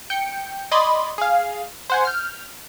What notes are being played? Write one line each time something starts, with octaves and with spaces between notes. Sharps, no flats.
G5 G6 C#7
D5 D#5 B5 C6 G#6 A6
G#4 F5
C5 F#5 G#5
F6 G6